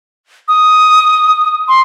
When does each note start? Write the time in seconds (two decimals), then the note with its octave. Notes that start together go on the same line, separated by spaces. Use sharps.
0.48 D#6
1.68 C6